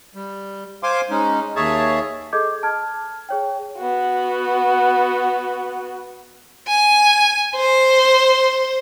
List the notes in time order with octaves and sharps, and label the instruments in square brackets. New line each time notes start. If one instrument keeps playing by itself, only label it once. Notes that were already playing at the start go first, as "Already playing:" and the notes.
[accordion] G3
C5 F5 G#5 C6 D6
G#3 C#4 D#4
D#2 G#4 C#5 E5 A5
[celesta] G#4 A4 D#5 D6 G6 G#6
A5 F6 G#6
G#4 C#5 G5
[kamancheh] B3 F#4
[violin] G#5
C5